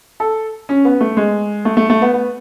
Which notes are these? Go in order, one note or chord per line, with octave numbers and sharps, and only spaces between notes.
A4
C#4
B3
A3
G#3
A3
A3
A3
B3
B3